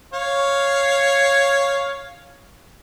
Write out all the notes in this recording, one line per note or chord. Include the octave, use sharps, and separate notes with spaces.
C#5 F5